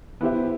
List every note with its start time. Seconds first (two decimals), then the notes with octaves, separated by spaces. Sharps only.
0.21 B3 E4 G4 C5 E5